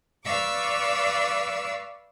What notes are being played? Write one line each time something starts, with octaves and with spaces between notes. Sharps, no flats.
B4 D5 F5 C#6 D6 E6